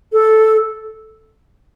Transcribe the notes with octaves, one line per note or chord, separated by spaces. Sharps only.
A4